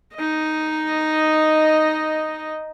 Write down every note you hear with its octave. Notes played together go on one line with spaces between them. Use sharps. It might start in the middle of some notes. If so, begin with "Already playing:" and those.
D#4 D#5